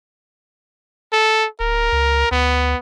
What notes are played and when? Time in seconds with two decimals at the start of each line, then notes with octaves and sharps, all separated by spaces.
1.12 A4
1.60 D1 A#4
1.92 C#2
2.31 D2 B3